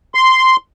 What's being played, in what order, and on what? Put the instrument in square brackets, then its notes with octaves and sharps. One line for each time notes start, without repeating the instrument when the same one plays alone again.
[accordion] C6